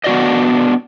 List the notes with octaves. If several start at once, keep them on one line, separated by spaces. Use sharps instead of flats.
B3 D4 F#4 D5 D#5